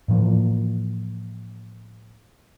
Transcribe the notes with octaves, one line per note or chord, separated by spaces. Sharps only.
A2 E3 F3 A#3